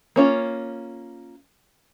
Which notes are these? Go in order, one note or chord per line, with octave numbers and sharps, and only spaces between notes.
A#3 C#4 F4